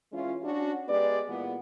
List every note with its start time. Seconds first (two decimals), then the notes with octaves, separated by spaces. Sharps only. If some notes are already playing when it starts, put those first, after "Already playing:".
0.12 E3 G#3 C#4 E4 F4
0.43 C#4 D4 F#4
0.88 G#3 B3 G4 D5
1.27 A#2 E3 G#3 B3